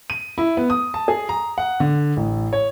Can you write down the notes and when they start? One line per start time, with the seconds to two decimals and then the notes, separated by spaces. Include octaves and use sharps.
0.10 D#7
0.38 E4
0.57 B3
0.70 D#6
0.94 A5
1.08 G#4
1.29 A#5
1.58 F#5
1.80 D3
2.17 A1
2.53 C#5